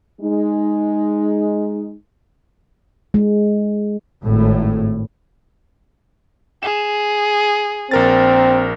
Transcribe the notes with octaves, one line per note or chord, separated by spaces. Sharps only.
G#3 D#4
G#3
G#1 A2
G#4 E7
A#1 C4 A#4 A6